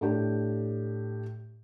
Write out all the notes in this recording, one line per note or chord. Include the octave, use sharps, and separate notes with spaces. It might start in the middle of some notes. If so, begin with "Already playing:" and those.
A2 D4 G4